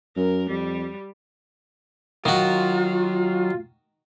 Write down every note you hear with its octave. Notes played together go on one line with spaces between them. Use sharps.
F#2 A#4
F2 G3
D#3 F#3 F4 F#4